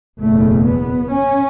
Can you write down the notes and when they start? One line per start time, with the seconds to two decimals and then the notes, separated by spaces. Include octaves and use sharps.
0.19 F#1 E2 B2 A3
0.66 B3
1.12 C#4